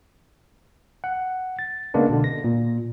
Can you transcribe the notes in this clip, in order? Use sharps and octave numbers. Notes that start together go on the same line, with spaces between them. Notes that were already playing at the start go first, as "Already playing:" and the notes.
F#5
A6
C#3 G#3 A#3 B3 D4
B2 D3
A#6
A#2